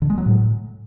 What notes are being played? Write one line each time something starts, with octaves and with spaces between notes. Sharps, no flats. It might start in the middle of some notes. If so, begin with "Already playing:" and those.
D3
G#3
F#3
A2